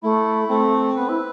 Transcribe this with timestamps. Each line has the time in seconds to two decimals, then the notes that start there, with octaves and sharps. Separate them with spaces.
0.03 A3 E4
0.49 A3 C4
0.96 B3 B4
1.08 E4